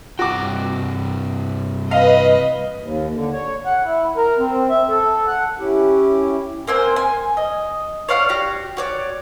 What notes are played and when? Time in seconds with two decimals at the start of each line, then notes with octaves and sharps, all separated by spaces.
0.19 G2 C3 F#4 G5 D6
1.91 B4 D#5 F5
2.80 D#2
3.15 D3
3.33 C#5
3.65 F#5
3.85 E4
4.17 A#4
4.39 C4
4.70 E5
4.89 A4
5.27 F#5
5.58 C#4 E4 G4
6.67 A#3 C4 C5 G#5
6.96 G#5
7.37 D#5
8.09 C#5 D5 F5 F#5
8.29 F#4 G4 C#5
8.77 F#4 C#5 D5